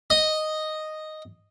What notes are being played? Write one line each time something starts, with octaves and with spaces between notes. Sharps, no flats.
D#5